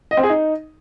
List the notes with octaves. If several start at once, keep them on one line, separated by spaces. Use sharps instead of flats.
D#5
C4
G#4
D#4